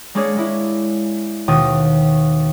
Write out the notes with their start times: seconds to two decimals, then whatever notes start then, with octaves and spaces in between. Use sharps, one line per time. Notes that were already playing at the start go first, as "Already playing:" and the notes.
0.15 G#3 A#3 D4 G#4 C#5
0.36 G#3 E4
1.48 D#2 B2 D#3 F#4 D#6